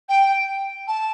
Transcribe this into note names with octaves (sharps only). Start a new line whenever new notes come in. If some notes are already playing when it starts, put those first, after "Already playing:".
G5
A5